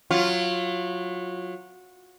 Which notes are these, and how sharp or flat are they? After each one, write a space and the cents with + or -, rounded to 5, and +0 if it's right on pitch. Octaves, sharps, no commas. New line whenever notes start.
F#3 -20 F4 -10